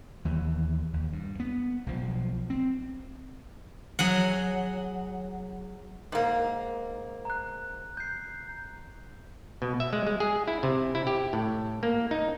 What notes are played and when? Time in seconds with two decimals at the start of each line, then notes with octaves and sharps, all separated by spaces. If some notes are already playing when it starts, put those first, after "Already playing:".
0.25 D#2 E3
0.93 D#2
1.13 G2
1.40 B3
1.86 B1 F3
2.50 C4
3.99 F#3 G#4 F#5
6.12 G#2 A#3
7.25 A#5 F#6
7.97 G6 C7
9.62 B2
9.80 E5
9.93 G#3
10.07 G#3
10.20 G#4
10.48 E4
10.63 C3
10.95 E4
11.07 G4
11.33 A2
11.83 A#3
12.11 D#4